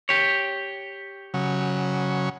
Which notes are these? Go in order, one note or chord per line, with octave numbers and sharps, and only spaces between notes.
G4 C#5
C#3 F#3